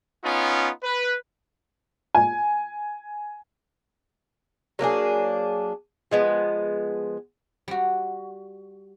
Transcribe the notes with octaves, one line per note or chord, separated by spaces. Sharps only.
B3 C#4 D#4 F4
B4
G#5
F#3 A#3 D4 G#4
F3 G#3 B3
G3 F#4